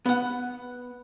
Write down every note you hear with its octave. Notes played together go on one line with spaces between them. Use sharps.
B3 F#5